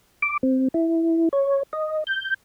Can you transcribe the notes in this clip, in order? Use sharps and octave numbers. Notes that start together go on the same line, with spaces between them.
D6
C4
E4
C#5
D#5
G6